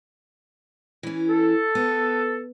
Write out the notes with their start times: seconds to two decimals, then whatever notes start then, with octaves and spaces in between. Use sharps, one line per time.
1.03 E3 C#4
1.29 A4
1.75 B3